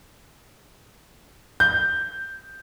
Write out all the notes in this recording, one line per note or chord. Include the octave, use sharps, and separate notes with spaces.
G6